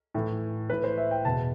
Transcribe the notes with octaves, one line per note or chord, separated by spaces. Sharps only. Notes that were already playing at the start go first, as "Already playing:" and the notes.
A2 E3
A2 E3 B4
C5
E5
G5
E2 B2 A5